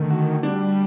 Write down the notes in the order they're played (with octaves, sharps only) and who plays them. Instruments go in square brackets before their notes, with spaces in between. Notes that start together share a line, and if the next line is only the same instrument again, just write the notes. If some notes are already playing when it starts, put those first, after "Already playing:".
Already playing: [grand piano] D3 A3 [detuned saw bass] D#3
[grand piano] F#4
[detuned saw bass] G3 [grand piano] D4